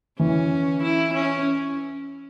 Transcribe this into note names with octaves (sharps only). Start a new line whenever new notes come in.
E3 C#4
E4
C#4